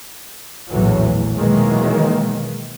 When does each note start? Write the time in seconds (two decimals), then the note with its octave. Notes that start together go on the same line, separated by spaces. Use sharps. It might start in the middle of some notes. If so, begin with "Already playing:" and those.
0.71 A#1 E2 A2 E3 F#3
1.37 B2 D#3 E3 F#3 G#3 A#3